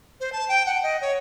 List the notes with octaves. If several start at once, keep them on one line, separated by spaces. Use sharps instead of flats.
C5
A5
G5
F#5
D#5
C#5